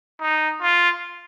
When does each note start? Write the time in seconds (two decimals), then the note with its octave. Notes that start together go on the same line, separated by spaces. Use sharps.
0.21 D#4
0.61 F4